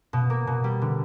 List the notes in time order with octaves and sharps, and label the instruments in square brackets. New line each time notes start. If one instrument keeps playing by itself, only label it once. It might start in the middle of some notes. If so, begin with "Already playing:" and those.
[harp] B2
A#3
B2
G3
D3